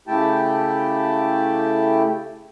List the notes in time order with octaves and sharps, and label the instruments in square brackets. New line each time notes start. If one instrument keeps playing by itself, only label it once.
[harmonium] C#3 A3 E4 G4 G5 A5